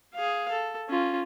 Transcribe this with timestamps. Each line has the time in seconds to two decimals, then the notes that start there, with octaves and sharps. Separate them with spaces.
0.14 G#4 F5
0.51 A4
0.89 C#4 F4